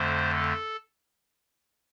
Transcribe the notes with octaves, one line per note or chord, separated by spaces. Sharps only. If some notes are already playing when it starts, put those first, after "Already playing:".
Already playing: F2 D3 A3 C5
A4